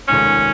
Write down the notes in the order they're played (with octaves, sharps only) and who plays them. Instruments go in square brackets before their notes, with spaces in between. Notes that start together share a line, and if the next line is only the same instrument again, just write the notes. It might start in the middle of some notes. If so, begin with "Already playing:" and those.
[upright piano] F1 D#2 D#3 G#3 [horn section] C#4